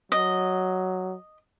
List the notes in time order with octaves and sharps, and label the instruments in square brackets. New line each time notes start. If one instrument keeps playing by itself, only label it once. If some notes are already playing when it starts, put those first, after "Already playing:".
[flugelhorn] F#3 [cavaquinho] D#5